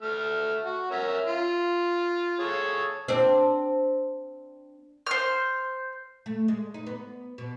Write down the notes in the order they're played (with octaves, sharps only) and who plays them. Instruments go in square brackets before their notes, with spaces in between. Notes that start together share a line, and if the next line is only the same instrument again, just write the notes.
[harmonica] A3 F6
F#4
C#4 A#4 E5
F4
G#4 A4 C#5
[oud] C4 D4
[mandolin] C5 F6
[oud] A3
G#3
D#4
B3
B2